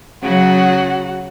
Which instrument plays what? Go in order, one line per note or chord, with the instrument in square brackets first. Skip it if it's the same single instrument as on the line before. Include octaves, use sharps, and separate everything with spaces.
[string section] C#3 F#3 [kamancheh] F#4 F#5